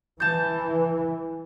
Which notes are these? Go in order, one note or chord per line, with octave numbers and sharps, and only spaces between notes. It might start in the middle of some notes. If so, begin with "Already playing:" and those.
E3 A5 G6